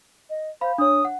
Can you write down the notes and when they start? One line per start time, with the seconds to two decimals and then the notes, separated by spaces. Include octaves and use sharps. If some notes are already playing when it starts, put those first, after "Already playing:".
0.30 D#5
0.61 C5 F5 B5
0.78 D4 C#5 D#6
1.05 F#5